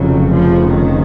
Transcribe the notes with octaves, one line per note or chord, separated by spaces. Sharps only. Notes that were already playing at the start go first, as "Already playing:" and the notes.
Already playing: F1 F2 C#3 F#3
F3
D#3